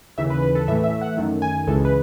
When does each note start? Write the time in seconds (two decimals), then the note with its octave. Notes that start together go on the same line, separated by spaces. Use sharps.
0.18 D#2 C#3 E3 E5
0.30 B4
0.42 B4
0.55 A4
0.68 A2 E3 A3 E5
0.84 E5
1.01 F#5
1.17 F#2 D#3 A3
1.42 G#5
1.67 C#2 C#3 E3 G#3 A4
1.85 B4